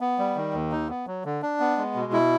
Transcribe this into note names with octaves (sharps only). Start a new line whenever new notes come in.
B3
G3
D#3
D#2
D#4
B3
F#3
D3
D4
B3
G#3
B2
E4